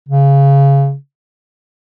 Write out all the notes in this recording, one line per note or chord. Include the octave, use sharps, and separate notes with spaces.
C#3